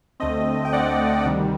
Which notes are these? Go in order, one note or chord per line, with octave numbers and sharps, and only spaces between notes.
D2 D3 A3 C4 D#5
G5
D2 D3 A3 C4 D5 F#5
D2 C3 D#3 G3